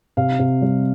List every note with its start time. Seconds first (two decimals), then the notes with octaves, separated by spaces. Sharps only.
0.17 C3 F5
0.39 C3
0.62 G3